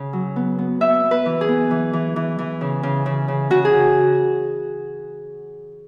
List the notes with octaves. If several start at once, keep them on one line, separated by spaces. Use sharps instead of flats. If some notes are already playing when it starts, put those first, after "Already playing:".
Already playing: C#3
F#3
B3
B3
B3 E5
B3
B4
E3
G#4
B3
E3
E3
E3
E3
C#3
C#3
C#3
C#3
C#3 F#4
G#4
C#3